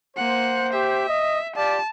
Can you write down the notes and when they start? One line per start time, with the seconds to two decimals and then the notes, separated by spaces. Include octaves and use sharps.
0.17 A#3 C5 F#5
0.73 G4 E5
1.08 D#5
1.56 F4 G4 D5 A5